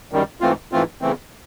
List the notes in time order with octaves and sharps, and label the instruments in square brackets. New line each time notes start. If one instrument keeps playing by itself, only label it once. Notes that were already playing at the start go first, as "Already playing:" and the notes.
[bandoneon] F#2 D#3 G3
G#2 E3 A3 C4 F4
G#2 E3 A3 C4 F4
E2 C#3 E3 A3 C4